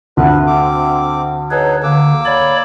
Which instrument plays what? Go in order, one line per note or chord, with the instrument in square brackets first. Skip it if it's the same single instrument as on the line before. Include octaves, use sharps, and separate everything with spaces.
[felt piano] D2 [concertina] B4
[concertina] C4 D6
[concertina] D#4 G#4 A4 [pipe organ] B4 C#5
[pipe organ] D3 [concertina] A#3 D6 E6
[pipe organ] C#5 D5 B5